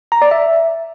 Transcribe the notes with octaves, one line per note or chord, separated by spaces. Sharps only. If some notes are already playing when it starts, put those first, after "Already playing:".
A#5
D5
E5